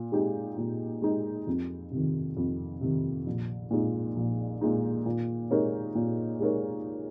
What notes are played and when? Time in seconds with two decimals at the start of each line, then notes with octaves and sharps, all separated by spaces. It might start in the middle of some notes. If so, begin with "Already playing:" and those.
Already playing: A#2
0.12 G#3 D#4 G4
0.58 A#2
1.02 G#3 D#4 G4
1.47 F2
1.91 C3 D#3
2.37 F2
2.81 C3 D#3
3.27 A#1
3.71 A#2 G#3 D#4
4.17 A#1
4.61 A#2 G#3 D#4
5.06 A#2
5.51 G#3 D#4 A#4 C#5
5.95 A#2
6.40 G#3 D#4 A#4 C#5